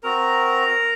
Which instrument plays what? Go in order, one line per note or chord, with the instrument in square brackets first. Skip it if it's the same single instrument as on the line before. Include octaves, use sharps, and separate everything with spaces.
[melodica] C4 F#4 A#4 A#5